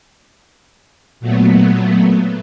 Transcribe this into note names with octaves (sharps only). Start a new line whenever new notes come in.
A#2 F#3 A3 B3